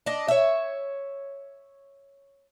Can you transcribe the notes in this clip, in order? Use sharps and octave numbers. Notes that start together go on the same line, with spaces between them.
D4 D#5
C#5 E5